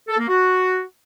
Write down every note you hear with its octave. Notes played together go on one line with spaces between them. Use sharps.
A4
A#3
F#4